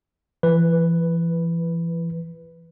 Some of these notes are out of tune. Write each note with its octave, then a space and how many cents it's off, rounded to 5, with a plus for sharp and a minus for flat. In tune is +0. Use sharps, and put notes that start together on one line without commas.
E3 +35 B4 +0